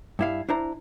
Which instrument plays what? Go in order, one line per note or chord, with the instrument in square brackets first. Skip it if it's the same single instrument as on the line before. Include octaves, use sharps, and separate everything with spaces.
[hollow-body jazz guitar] G2 E4 F5
D4 E4 C5 A#5